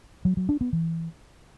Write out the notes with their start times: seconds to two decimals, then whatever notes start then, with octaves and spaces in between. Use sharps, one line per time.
0.25 F#3
0.37 F#3
0.49 D4
0.61 B3
0.73 E3